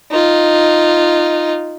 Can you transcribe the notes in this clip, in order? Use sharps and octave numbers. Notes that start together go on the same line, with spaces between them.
D#4 F4